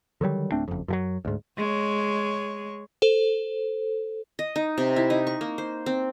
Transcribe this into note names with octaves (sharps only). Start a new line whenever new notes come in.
D3 D#3 F#3 G3
D1 A3 C4 D4
F#1 F2
F#2 F3 F#3
D2 G#2
G#3 C#5
A4 C5
D#5
D#4
C3
E4
D#4
C#6
A#3
C5
C4